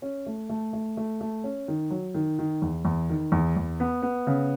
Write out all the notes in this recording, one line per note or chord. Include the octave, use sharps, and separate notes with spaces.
C#4
A3
A3
A3
A3
A3
C#4
D#3
F#3
D#3
D#3
E2
E2
D#3
E2
E2
B3
B3
C#3